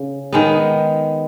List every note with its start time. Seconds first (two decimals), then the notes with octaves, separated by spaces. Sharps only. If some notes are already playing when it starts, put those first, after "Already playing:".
Already playing: C#3
0.33 D#3 G#3 B3